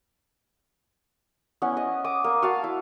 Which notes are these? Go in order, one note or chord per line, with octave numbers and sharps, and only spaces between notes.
B3 C#4 E4 F#5
D#5
D6 D#6
A#3
F#4 F5 A5
E4